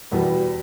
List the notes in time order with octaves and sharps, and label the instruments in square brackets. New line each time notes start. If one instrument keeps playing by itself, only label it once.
[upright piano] E2 B2 G3 B3